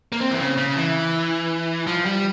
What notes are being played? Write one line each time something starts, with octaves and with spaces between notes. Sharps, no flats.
A#3
C4
E3
C#3
C#3
E3
F3
G3